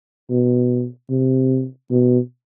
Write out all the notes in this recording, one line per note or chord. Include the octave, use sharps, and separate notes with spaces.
B2
C3
B2